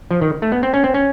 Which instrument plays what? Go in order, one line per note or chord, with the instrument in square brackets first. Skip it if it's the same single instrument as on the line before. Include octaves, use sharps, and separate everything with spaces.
[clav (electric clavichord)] F3
D#3
A3
B3
C4
C#4
C4
C#4